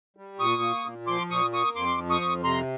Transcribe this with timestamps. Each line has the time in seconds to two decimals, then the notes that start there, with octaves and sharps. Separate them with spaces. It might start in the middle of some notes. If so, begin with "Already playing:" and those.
0.17 G3
0.39 A#2 C#6 D#6
0.62 A#3
0.85 A#2
1.07 F3 C6 D6
1.30 A#2 C#6 D#6
1.52 A#3 C#6 D#6
1.75 F2 C6 D6
1.98 F3
2.10 C#6 D#6
2.22 F2
2.44 C3 A#5 C6